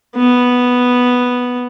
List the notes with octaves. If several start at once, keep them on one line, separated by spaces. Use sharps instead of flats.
B3